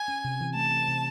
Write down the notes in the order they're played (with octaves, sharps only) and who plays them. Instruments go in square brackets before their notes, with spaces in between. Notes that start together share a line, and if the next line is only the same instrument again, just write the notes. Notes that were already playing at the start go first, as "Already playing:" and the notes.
Already playing: [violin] G#5
[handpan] C#4
C3
E3
[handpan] A3 [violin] A5
[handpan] C4
C3